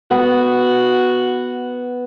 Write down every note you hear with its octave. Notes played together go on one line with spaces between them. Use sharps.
B3 F#4